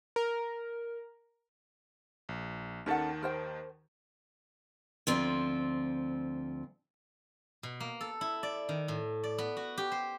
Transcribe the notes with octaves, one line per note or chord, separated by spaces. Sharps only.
A#4
A#1
D#2 D#3 C#4 A4 F#5 A5
A#4 C5 G5
D2 F3 C4
B2
A#3
A4
E4
D5
D#3
A2
D5
B3
F#4
G4
C5